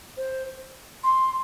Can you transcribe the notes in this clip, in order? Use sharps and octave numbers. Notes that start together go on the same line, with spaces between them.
C5
C6